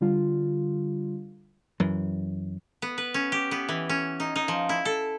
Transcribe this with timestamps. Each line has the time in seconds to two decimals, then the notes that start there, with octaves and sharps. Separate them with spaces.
0.01 D3 G3 F4
1.80 F#2 E3
2.82 B3
2.98 B4
3.14 C#4
3.32 G4
3.51 B3
3.69 E3
3.89 C#4
4.20 D#4
4.36 D#4
4.48 F3
4.69 E4
4.85 A4